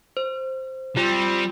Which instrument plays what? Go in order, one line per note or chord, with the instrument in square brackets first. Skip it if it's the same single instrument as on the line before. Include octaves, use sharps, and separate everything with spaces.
[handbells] C5
[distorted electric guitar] G3 [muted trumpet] C4 [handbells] F4